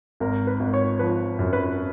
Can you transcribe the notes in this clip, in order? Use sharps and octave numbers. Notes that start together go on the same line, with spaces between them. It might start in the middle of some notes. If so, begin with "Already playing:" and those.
G#1 A#4
B4
G#1
C#5
F3 B4
F#2
B4